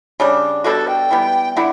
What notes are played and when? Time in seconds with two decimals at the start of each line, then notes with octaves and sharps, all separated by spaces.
0.20 C#3 G3 D4
0.64 B2 G3 D4 F#4 A4
0.88 G5
1.11 E3 G3 B3
1.56 D3 A3 E4 F#5